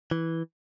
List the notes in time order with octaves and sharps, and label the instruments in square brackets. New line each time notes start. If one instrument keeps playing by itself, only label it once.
[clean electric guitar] E3